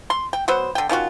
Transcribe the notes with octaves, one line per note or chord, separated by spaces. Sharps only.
C6
G5
F#3 B3 C5
D3 G5
D#3 C#4 F4 F#4